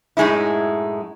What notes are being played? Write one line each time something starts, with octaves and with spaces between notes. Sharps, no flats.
F#2 A2 G#3 D#4 E4